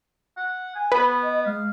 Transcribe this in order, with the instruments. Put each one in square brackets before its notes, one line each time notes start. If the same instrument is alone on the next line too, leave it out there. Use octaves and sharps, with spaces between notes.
[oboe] F#5
G#5
[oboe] B3 [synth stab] B4
[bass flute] D#5
[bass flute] G#3 [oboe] F5